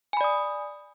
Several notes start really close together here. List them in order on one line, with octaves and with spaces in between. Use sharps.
G#5 B5 D5 D#6